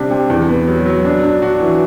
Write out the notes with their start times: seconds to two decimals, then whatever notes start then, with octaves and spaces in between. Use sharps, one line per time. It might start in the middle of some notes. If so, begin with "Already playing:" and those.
Already playing: C3 G3 D4
0.11 C3
0.30 E2
0.49 B3
0.67 F#3
0.86 F#3
1.05 D4
1.24 D4
1.42 F#4
1.60 E3